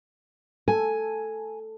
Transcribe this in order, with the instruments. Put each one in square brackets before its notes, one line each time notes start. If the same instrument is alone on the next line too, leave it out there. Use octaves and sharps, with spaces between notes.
[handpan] A4 [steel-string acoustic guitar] G#5